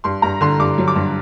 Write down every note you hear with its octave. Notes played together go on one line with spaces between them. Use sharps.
G2 C6
G2 A#5
D3 C6
G2 D6
F#3
D6
G2